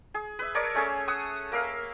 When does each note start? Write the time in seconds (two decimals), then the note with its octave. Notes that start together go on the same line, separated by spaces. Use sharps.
0.14 G#4
0.39 B4 E5
0.55 A#4 C#5 D5 A5
0.75 A3 C#4 G#4 A4
1.08 F#5 C#6 D#6
1.52 A#3 A#4 E5 F5